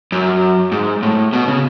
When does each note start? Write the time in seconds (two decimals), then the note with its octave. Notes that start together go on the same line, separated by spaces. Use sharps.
0.12 F#2
0.72 G#2
1.03 A2
1.33 B2
1.48 C#3